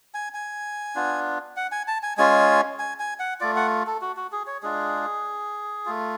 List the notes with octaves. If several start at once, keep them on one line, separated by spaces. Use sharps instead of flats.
G#5
G#5
B3 D4 F4
F#5
G#5
A5
G#5
G#3 C#4 F4 G#5
G#5
G#5
F#5
A3 F4 D5
F#5
A4
F#4
F#4
G#4
C#5
G#3 D4 F4 G#4
A3 F4